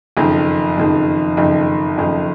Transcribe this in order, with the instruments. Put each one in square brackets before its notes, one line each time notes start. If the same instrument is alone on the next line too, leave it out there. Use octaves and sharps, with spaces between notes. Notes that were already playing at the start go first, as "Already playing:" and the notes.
[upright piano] F#1 F2 D#3
F#1 F2 D#3
F#1 F2 D#3
F#1 F2 D#3